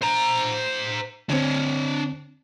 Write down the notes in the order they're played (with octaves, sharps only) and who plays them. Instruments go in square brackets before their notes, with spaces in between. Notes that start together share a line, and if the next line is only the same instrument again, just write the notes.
[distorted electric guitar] C5 A#5
[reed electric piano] D3 C4 [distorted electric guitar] D4 C#5